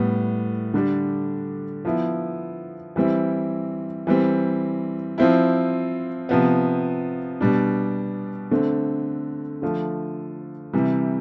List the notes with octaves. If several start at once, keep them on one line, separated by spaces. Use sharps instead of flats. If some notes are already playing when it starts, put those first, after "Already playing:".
Already playing: A2 G3 B3
D3 G3 D4
F3 B3 E4
E3 G3 C4 E4
E3 G3 C4
F3 C4 E4
C3 F3 B3
B2 G3 D4
D3 A3 C4
D3 F3 A3
C3 E3 G3